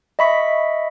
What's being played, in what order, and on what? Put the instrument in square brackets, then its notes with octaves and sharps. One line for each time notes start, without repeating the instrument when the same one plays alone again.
[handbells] D#5 E5 B5 C#6 B6